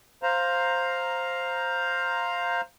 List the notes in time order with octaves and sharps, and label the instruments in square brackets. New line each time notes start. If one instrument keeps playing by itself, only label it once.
[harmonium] C5 F5 A#5